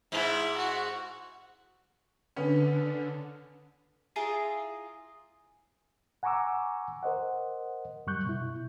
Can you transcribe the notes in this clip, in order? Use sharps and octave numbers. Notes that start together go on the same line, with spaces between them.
G#2 E4
F#4
D3 B3 C#4
E4 F4 G#4 A#5
F#5 G#5 A#5 C#6 D6 E6
A#4 C5 D#5 F#5
F#2 G3 C#6 F#6 G6
B2 E4